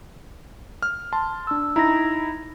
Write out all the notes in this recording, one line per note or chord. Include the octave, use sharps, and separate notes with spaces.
F6
A5 C6
D4 E6
D#4 E4 A#5 A#6